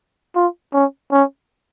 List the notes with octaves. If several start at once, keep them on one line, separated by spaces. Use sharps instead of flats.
F4
C#4
C#4